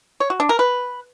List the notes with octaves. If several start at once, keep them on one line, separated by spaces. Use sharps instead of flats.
C#5
F#4
D4
A#4
B4